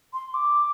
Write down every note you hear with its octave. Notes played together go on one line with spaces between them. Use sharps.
C6
D6